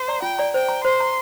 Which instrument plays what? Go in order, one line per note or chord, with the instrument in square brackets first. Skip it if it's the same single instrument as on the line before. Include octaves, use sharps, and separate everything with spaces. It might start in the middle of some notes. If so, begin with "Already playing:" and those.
Already playing: [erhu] C5
[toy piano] D5 A#5
[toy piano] F4 [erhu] G5
[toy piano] D5 A#5
[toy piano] C5 [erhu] G5
[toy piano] A#5
[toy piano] C5 [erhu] C6
[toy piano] A#5